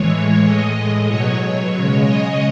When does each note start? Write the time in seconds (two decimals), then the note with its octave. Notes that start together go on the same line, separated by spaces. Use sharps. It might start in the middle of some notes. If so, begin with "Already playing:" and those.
Already playing: A2 E3 G#3 C#5
0.43 A2 G#3 D#5
1.06 B2 F#3 C#5
1.70 C#3 G#3 C#5
2.03 D#5